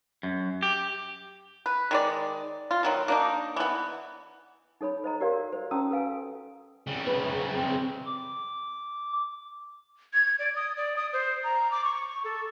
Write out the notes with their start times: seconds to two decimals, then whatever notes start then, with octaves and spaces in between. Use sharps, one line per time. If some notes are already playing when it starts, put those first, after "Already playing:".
0.23 F#2
0.63 G4
1.66 B4
1.91 D#3 G#3 D5
2.71 F4
2.83 B2 D#3 F#3
3.08 A#3 D4 D#4
3.56 E3 B3
4.81 D#4 A4 C#5 B5
5.04 C5 D#5 A#5
5.20 F#4 G4 A#4 C#5 D5 F5
5.53 C5
5.71 C#4 F#4 A5 A#5 D#6 E6
5.91 A4 B4 F5 G#5
6.87 C#3 G3
7.07 B4
7.24 F#2
7.56 C4
8.06 D6
10.13 G#6
10.39 D5
10.56 D#6
10.77 D5
10.97 D#6
11.13 C5
11.44 A#5
11.71 D6
11.84 C#6
12.24 A4